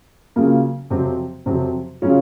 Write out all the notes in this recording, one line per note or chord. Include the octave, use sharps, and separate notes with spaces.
C#3 F#3 A#3 F4
F2 C3 F#3 C4
F2 C3 F#3 C4
C#3 F#3 C#4 F4